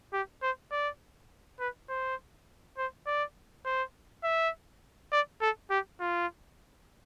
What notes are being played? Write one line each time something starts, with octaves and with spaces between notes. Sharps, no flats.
G4
C5
D5
B4
C5
C5
D5
C5
E5
D5
A4
G4
F4